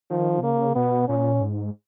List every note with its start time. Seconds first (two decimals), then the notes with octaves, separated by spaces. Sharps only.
0.10 D#3 F3
0.38 B2
0.43 C#3 A#3
0.75 B2 B3
1.08 A#2 C#4
1.41 G#2